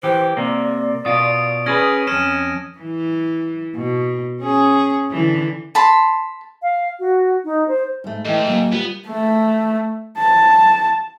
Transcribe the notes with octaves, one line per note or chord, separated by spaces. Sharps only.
E3 G4 C5
C3 A#3 D5
B2 F4 D#6 D7
C#4 G#4 B4 F6 G#6 A#6
F2 C#4 F6 D#7 E7
E3
B2
C#4 G#4
D3 E3
A5 B5 C6
F5
F#4
D#4
C5
G#2 A3
G#2 E3 A3 D#5 G5
C#3 F#3 A#3
G3 B3 F4
A3
A5